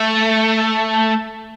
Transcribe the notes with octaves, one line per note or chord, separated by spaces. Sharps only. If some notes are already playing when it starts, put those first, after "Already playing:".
Already playing: A3